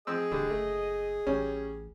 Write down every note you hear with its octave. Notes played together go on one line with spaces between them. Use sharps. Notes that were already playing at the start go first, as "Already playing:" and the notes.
F3 C4 G#4 D#5 E6
D#1 D3 G3
F#1 A3
A1 G3 C#4